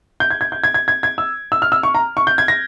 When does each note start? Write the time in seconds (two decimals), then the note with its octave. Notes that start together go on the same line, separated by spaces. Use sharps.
0.20 G6
0.31 G#6
0.41 G#6
0.52 G6
0.64 G#6
0.74 G#6
0.88 G#6
1.03 G#6
1.18 E6
1.52 E6
1.62 F6
1.72 E6
1.83 C#6
1.95 A#5
2.17 C#6
2.27 G6
2.38 G#6
2.48 A#6